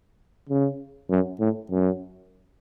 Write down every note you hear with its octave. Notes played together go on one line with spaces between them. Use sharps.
C#3
F#2
A2
F#2